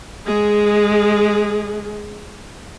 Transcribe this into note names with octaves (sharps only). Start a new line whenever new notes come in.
G#3 G#4